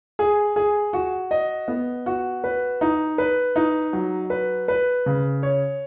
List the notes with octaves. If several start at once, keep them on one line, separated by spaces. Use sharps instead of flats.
G#4
G#4
F#4
D#5
B3
F#4
B4
D#4
B4
D#4
F#3
B4
B4
C#3
C#5